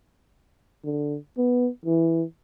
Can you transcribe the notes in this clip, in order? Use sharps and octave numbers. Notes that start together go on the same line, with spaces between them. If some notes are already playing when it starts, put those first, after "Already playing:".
D3
B3
E3